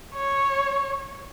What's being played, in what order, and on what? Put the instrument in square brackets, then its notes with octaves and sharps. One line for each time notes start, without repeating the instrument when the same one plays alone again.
[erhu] C#5